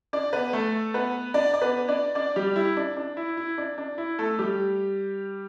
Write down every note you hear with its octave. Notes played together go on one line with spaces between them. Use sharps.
D4 D5
B3 B4
A3 A4
B3 B4
D4 D5
D5
B3 B4
D4 D5
D4 D5
G3 G4
E4
D4
D4
E4
E4
D4
D4
E4
A3 A4
G3 G4